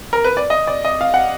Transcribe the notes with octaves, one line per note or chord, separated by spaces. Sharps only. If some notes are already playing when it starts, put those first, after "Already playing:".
A#4
B4
D5
D#5
D5
D#5
F5
F#5